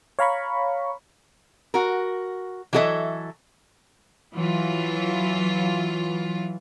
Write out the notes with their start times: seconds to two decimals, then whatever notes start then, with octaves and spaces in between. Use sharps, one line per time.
0.19 C#5 F5 A#5 B5 C#6
1.74 F#4 A#4
2.73 E3 F#3 F#4 A4 D#5 E5
4.34 E3 F#3 F4